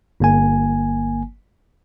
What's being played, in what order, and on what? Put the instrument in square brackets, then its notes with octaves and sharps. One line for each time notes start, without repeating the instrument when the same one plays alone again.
[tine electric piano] G1 A#3 G#5